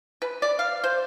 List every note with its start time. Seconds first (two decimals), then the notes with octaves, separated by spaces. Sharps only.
0.22 B4
0.42 D5
0.59 F5
0.84 C5